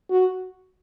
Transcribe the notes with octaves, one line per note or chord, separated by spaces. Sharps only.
F#4